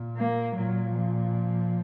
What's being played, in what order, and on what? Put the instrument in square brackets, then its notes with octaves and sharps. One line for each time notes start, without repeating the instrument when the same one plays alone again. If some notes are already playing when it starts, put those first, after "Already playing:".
Already playing: [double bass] A#2
[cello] A#3
[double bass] A#2 [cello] F#3
[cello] F3